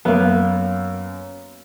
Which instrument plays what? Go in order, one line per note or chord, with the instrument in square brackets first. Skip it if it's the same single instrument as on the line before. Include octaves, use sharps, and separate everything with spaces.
[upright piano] F#2 [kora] A#3 B3